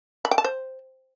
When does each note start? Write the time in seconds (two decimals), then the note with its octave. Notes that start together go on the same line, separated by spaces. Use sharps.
0.25 B5
0.31 G5
0.38 A5
0.44 C5